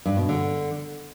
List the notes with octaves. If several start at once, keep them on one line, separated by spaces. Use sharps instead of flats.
G2
B2
D3